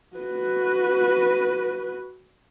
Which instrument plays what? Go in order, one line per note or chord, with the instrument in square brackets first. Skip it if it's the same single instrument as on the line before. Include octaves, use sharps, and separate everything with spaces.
[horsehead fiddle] F#4 B4